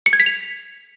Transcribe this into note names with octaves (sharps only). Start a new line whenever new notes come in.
C#7
G#6
B6
F7